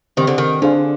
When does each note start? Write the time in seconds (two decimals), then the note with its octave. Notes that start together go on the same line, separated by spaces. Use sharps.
0.17 D#3 C4 G4 C5
0.27 D3
0.38 D#3
0.62 D3 D4 G#4 C5 F5